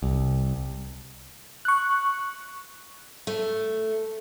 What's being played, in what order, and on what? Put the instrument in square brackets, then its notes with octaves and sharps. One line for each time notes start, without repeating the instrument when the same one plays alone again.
[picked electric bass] C2
[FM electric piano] C#6 F#6
[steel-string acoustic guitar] A3